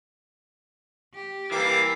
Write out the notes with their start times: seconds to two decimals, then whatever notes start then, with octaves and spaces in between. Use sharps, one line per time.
1.14 G4
1.51 E3 G3 A#3 D6 C7